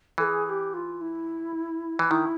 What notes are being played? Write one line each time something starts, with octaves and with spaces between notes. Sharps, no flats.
E3 A4
G#4
G#4
G4
F4
E4
E3
D#3 E4